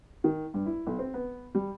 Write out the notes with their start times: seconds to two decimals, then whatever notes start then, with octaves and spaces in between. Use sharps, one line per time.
0.24 D#3
0.54 G2
0.66 E4
0.87 B1
0.99 C4
1.14 B3
1.55 G3